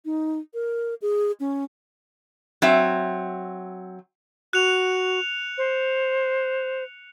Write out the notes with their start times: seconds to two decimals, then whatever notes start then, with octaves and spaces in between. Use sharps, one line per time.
0.05 D#4
0.54 A#4
1.02 G#4
1.40 C#4
2.62 F#3 C4 E5
4.53 F#4 F#6 C#7 F7
5.58 C5